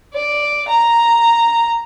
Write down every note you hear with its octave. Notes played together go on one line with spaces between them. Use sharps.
D5
A#5